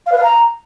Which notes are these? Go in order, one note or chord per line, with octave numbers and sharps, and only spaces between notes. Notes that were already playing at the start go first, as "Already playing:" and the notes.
F5
B4
F5
A#5